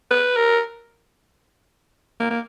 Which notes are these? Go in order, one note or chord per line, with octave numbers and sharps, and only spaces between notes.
B4
A#4
A#3
A#3